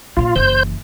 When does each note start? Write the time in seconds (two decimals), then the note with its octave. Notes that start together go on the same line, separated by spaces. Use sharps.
0.17 A#2 F#3 F4
0.36 F#1 E3 C5 G6